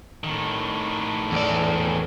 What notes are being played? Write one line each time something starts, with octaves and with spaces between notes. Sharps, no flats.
A2 D#3
E2 D5